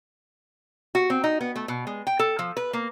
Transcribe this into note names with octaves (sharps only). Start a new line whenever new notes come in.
F#4
C4
D#4
B3
A3
B2
G#3
G5
A4
F3
B4
A#3